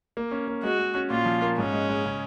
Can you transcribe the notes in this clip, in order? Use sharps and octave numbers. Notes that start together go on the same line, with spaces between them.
A#3
C#4
A#3
G#3 F#4
G#3
C#4
A#2 F4
F3
A#3
G#2 C#4
G#3
G#3
C#3